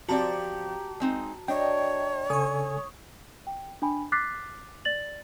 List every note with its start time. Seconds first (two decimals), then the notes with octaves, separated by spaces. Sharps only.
0.09 F3 C4 F#4 G4 D5 A5 A#5
1.00 G#3 C4 D#4
1.48 D4 C#5 D#5 G5
2.30 C#3 A4 G#5 C#6 D#6
3.47 G5
3.82 D4 G5 G#5 B5
4.12 D6 F6 F#6 A6 B6 C7
4.85 D5 A6 F#7